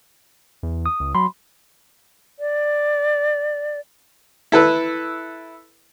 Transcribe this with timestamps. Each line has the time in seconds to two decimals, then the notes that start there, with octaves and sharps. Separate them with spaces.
0.63 E2
0.86 D#6
1.00 C#2
1.15 F#3 B5 C6
2.39 D5
4.52 E4 A4 B4